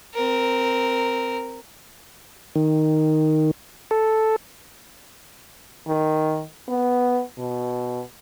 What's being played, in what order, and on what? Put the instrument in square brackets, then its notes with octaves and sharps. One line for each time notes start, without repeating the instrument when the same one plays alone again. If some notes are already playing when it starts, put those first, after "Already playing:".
[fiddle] C4 A#4
[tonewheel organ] D#3
A4
[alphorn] D#3
B3
B2